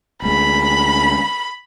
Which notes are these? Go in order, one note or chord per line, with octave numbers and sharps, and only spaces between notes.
D2 G#3 B5